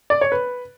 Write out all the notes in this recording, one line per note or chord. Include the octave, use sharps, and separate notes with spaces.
D5
C#5
B4